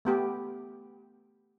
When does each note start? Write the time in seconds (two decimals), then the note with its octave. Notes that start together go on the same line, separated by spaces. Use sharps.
0.05 A3 B3 G4